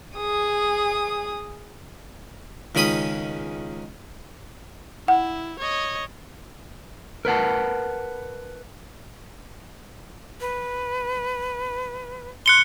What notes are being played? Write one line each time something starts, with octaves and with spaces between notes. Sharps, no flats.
G#4 D#6
C#2 D#3 C#4 B5 D#6
E4 F#5
C#5 D#5
A#4 B4 F#5 A5
B4
C6 F#6 C#7 G7